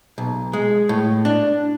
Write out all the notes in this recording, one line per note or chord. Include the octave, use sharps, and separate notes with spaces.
B1
G#3
A2
D4